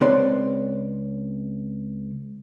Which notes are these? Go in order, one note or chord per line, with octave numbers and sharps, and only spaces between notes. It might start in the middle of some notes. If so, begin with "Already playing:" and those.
C#2 C4 B4 C#5 D5 C6